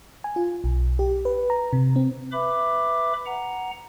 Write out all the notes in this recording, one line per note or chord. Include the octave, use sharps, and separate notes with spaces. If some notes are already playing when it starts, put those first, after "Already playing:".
G#5
F4
B1
G4
B4
A#5
C3
C4
B4 E5 B5 D6
F#5 A#5